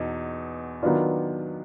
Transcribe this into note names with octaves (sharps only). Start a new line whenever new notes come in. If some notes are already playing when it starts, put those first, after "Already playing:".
Already playing: E2 B2 D#4
D#3 F#3 B3 D4 F4